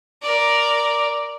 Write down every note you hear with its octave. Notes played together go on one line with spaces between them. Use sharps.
A#4 D5